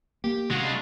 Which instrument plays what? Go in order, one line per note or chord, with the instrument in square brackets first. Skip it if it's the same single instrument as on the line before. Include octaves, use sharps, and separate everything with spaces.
[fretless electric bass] A#3 [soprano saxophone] G4
[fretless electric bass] C3 [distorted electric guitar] G#3 F4 [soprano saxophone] F#4
[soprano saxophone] D4